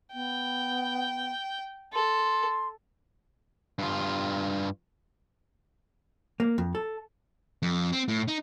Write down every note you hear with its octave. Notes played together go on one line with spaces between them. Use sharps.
B3 G5
A4 C6
G2 F4
A#3
F2
A4
F2
C4
A2
D#4